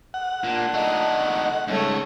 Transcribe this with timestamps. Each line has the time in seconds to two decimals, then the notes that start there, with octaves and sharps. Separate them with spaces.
0.14 F#5
0.44 A#2 D4
0.74 A3 D#4 D#5
1.68 G#2 C#3 G3 A3 C#5